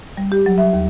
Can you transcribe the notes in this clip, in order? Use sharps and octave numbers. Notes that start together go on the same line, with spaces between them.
G3
G4
F#3
E5
D#2